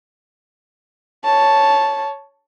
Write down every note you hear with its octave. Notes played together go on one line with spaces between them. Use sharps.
C#5 A5